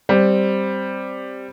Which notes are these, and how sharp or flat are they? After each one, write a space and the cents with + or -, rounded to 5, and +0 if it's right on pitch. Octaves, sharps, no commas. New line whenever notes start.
G3 +0 C4 +0